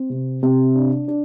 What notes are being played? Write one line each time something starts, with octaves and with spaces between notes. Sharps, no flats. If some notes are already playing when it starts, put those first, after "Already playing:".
Already playing: C4
C3
C3
D4
D4